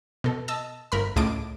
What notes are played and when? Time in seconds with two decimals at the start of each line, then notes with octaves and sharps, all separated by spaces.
0.24 B2 A4
0.48 D#5 A5 E6
0.92 G1 A#4 B5
1.16 C#2 A2 D#5 A5 D6 D7